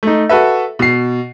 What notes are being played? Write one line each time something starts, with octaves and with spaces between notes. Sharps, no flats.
A3 D#4
F#4 A4 B4 E5
B2 C7